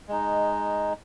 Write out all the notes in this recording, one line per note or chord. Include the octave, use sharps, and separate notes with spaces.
G#3 D#4